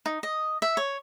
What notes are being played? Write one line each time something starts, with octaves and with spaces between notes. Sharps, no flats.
D#4
D#5
E5
C#5